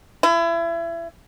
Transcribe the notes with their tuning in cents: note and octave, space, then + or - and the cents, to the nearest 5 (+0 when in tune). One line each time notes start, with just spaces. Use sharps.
E4 +30